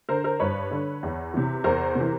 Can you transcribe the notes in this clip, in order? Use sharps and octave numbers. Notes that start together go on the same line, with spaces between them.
D3 A#4 C5
A#4 C5
G2 B4 C#5
D3
E2
C3 E3
E2 A#4 C5
C3
E3